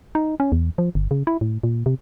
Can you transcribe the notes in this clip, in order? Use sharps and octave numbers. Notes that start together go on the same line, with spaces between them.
D#4
C#4
E2
F3
G1
C#3
E4
A2
A#2
C3